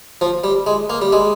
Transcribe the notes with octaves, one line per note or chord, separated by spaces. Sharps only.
F3
G3
G#3
A#3
G3
G#3